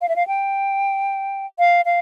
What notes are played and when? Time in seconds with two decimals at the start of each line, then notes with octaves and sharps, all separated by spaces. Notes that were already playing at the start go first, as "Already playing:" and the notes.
0.01 F5
0.09 E5
0.16 F5
0.28 G5
1.59 F5
1.85 F5